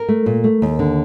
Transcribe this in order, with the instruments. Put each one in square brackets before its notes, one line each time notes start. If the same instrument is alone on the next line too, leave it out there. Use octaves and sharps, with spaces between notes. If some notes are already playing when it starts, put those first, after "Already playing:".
Already playing: [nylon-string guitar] A#4
A3
A#2
A3
D#2
D3